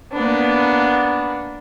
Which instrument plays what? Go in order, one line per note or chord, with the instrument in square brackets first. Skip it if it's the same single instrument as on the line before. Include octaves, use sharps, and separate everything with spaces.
[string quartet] A#3 B3 D4